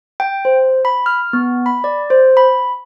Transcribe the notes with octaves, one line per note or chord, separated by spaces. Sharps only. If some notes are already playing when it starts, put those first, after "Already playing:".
G5
C5
B5
F6
B3
B5
D5
C5
B5